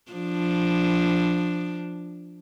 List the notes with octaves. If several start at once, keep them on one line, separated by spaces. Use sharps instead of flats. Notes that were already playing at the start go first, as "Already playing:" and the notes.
F3 D4